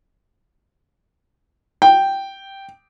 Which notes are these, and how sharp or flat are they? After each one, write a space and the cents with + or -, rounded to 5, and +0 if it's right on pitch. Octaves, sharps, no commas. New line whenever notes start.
G5 -5